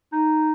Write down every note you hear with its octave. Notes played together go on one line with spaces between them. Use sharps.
D#4